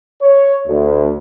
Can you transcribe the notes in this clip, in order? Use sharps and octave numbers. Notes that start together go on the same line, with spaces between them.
C#5
D2